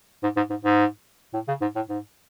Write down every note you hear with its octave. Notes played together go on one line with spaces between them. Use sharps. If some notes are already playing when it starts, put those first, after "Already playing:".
G#2
G#2
G#2
G#2
A2
C#3
G#2
A2
G#2